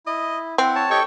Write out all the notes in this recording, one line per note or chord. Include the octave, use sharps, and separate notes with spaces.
E4 D#5
C4 E4 F#5
C#5 A5
G4 A4 C#5 D#5 G5 C#6